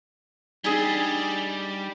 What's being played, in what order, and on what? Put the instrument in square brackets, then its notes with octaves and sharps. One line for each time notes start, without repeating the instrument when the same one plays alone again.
[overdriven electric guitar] G3 [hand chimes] D4 D#4 [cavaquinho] G#4 G#5